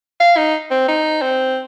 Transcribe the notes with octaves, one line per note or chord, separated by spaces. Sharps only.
F5
D#4
C4
D#4
C4